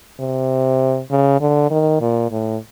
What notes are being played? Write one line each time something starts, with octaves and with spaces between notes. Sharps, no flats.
C3
C#3
D3
D#3
A#2
A2